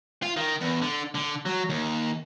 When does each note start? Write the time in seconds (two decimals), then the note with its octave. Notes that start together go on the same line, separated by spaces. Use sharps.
0.23 F4
0.37 D#3
0.61 E2
0.81 D3
1.15 D3
1.46 F#3
1.69 D#2